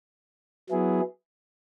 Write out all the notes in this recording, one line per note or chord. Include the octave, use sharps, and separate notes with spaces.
F#3 B3 E4 G#4